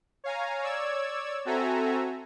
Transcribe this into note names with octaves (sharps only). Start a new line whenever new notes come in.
C#5 F5 G#5 A#5
C#5 D5 E6 G#6
C4 F#4 A4 E5 G#5 A#5